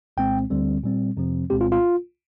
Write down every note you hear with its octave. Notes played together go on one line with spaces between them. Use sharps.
C2 A#2 G#3 C4 G5
D2 D3 G3 C4
A#2 G3 C4
F2 C3 F3 C4
C2 A#2 G#3 C4 G4
F4
F4